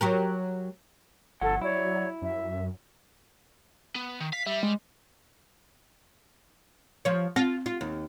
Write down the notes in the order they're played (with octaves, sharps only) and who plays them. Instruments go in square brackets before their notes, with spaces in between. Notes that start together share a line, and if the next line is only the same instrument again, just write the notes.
[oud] F#3 G4 A#4
[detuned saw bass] G1 [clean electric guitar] F3 F#5 [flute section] A4
[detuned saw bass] F#3 [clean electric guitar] E4 [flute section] C#5 D5
[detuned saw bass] F#2 [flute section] E5
[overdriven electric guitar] B3
D#3
[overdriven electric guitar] F5 [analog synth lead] B6
[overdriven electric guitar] G3 [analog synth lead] E5
[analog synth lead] G#3
[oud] F3 C#5
[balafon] C4 [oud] F4
[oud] F4
D#2